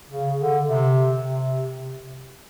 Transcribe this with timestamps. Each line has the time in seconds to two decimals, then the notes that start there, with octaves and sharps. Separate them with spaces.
0.10 C#3
0.39 D3
0.67 C3
1.23 C3